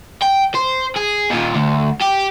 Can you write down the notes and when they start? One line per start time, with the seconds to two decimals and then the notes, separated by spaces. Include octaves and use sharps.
0.22 G5
0.55 C5
0.96 G#4
1.30 D#2 A#2
1.55 D2
2.01 G4